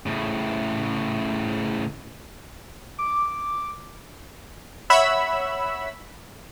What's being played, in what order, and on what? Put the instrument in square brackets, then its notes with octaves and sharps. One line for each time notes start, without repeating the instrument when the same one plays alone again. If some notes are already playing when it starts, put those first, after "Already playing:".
[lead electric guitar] A2 C#3
[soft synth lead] D6
[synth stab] C#5 E5 F#5 B5 E6